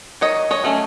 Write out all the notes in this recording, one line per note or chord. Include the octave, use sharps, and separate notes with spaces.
D#3 C#5 D#5
C#5 D#5
F#3 A3 C#4